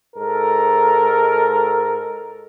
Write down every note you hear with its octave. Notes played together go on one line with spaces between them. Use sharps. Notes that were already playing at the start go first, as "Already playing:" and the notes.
G#2 A4 A#4